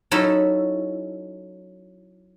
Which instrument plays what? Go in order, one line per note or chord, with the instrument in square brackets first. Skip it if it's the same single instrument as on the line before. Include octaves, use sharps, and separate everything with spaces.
[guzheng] F#3 C#4 D#4 E4 A4 E5